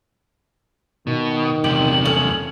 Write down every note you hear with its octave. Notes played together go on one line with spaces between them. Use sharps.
B2 D#3
E2 C3 G4 F#7
C#4 A4